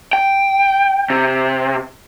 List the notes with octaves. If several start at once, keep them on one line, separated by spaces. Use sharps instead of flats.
G5
C3